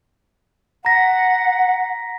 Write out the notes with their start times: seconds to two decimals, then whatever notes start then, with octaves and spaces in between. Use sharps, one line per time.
0.85 F#5 A#5 A#6 B6